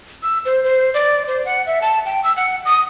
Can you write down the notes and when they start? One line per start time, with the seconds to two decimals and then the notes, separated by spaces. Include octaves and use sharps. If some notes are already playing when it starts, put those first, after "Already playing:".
0.23 E6
0.45 C5
0.64 C5
0.94 D5
1.28 C5
1.45 F#5
1.67 E5
1.82 A5
2.06 G5
2.24 E6
2.37 F#5
2.65 D#6